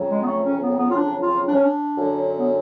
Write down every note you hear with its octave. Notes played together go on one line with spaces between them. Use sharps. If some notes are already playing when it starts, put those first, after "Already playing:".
Already playing: F2 C#3 F#3
G#3
B3
A3
C#4
B3
B3
F4
D4
F4
D4
C#4
D4
F#2 D3 F#3
B3